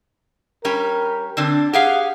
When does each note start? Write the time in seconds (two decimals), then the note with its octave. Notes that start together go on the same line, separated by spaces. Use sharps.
0.65 G3 C#4 G4 A#4
1.37 D3 C4 D4
1.73 G4 G#4 F5 F#5